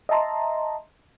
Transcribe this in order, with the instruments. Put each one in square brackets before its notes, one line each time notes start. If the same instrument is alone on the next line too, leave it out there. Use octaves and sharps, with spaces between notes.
[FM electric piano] D#5 E5 A5 A#5 C6